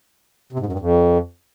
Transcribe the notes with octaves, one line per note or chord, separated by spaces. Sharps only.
C3
G#2
F#2
G2
F2